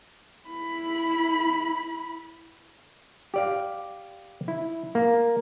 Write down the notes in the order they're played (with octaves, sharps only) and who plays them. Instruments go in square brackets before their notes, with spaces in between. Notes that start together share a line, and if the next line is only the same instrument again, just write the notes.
[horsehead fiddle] E4 B5
[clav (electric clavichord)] G4 D5 F5
E4
A#3